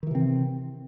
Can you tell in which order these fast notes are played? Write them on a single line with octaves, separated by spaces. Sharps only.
D#3 E3 C3 C4